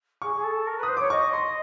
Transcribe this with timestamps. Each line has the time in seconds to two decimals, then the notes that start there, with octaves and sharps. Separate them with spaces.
0.22 G#4 C#6
0.35 G#4
0.43 A4
0.67 A#4
0.78 B4
0.83 D#6
0.88 C5
0.97 C#5 D6
1.10 D#5 C#6
1.33 C6